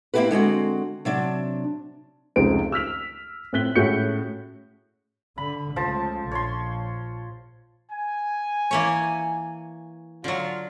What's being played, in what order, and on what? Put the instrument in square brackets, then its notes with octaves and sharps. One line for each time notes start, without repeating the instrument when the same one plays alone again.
[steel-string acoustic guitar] A#3 C4 D4 E4 G4 B4
D3 G#3 C4 F#4
C3 F#3 D4
[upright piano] F1 C#2 D#4 C5 D7
E6 F6 B6 F7
A2 C4 F#6 B6 G7
A2 G#3 C#4 F#4 G6 C#7
[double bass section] D3 [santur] B5
[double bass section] C#2 A3 [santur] F3 C5 A5
[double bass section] A#1 [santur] C#5 C6
[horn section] G#5
[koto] E3 A#3 C#5
[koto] D3 F#3 [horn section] F4